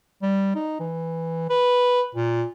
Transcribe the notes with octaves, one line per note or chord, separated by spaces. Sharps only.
G3
D#4
E3
B4
A#2